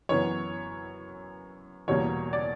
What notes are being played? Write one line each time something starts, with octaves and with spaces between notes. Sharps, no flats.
F#2 E3 B3 C#5
E2 B2 G3 A#3 C#5
D5